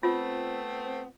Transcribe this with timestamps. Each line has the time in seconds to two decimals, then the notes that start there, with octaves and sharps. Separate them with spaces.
0.03 A3 B3 C4 F4